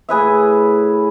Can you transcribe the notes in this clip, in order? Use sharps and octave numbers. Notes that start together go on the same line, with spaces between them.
A2 G#4 B4 E5